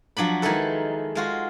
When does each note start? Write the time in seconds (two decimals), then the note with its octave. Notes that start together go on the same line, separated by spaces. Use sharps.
0.17 F3 F#3 D4 B5
0.42 D#3 G#3 D#4 E4 A4 B4
1.15 G#3 F4 F#4